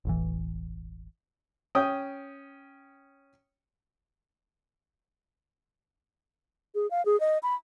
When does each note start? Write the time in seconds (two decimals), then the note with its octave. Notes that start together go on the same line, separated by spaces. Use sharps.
0.05 E1 A1 E3
1.75 C#4 G5 D#6
6.75 G#4
6.91 F5
7.05 G#4
7.20 D#5
7.43 B5